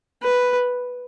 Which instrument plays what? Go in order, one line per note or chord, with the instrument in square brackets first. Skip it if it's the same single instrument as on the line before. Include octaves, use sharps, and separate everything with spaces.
[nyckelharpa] B4